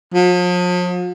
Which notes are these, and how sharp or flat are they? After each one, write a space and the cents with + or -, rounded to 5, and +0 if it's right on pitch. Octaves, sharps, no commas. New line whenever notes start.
F3 +45